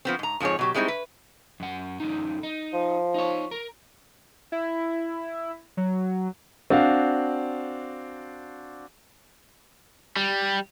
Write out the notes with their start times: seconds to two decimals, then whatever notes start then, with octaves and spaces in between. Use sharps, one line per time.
0.05 F3 B3 C4
0.19 G#2 A#5
0.40 F2 G#2 F3 G#4 C#5
0.59 B2 F#3 G4
0.74 G3 G#3 C4 D#4 E4
0.88 B4
1.60 F#2 F#5
2.00 F#2 D3 D#4
2.43 D#4
2.73 F3
3.14 D#4 C#5
3.51 A#4
4.52 E4
5.77 F#3
6.70 C4 D4 F#4 F5
10.17 G3